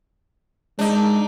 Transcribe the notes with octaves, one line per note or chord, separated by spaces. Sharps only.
G#3 D4 D#4